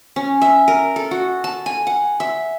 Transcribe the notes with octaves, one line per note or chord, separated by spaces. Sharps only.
C#4
E5
A#4
A4
F#4
A5
G#5
F#5
E5